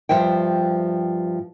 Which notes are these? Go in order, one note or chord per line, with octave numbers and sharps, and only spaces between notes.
G2 F3 C5 E5 G5